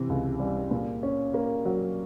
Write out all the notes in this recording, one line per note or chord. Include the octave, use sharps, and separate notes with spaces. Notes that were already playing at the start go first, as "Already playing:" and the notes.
Already playing: C3 E3
C#2
G3
A#2
C#4
A#3
F#3